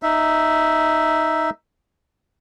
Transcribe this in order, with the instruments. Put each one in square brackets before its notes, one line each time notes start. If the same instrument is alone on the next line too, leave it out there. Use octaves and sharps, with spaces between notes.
[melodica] D#4 E5